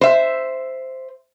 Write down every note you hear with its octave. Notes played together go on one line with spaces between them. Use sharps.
C5 E5